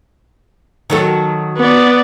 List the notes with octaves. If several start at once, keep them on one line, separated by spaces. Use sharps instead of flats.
D#3 F#3 A4
B3 D5